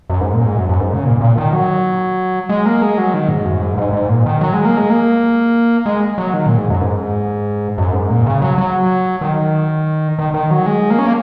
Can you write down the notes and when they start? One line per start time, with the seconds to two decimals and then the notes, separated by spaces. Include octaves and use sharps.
0.10 F#2
0.21 G#2
0.33 A#2
0.46 G#2
0.56 F#2
0.69 F#2
0.81 G#2
0.94 C#3
1.05 A#2
1.21 A#2
1.38 D#3
1.52 F#3
2.49 G#3
2.66 A#3
2.82 G#3
2.98 F#3
3.14 D#3
3.29 G#2
3.45 F#2
3.61 G#2
3.78 G#2
3.93 G#2
4.09 A#2
4.26 D#3
4.41 F#3
4.53 G#3
4.65 A#3
4.77 G#3
4.90 A#3
5.86 G#3
6.18 F#3
6.33 D#3
6.46 A#2
6.58 G#2
6.70 F#2
6.81 G#2
7.78 F#2
7.93 G#2
8.10 A#2
8.26 C#3
8.42 F#3
8.58 F#3
9.21 D#3
10.19 D#3
10.34 D#3
10.51 F#3
10.66 G#3
10.90 A#3
10.99 C#4
11.06 A#3